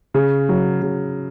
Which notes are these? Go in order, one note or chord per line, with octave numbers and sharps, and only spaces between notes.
C#3
F#3
C#3